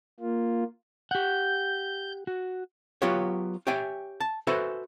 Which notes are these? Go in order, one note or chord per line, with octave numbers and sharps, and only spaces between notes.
A#3 F4
G4 F#5 G6
F#4
F#3 B3 F4 G4 C#5
G4 C#5 E5 G5 G#5
A5
F#4 A4 B4 C5 E5 G#5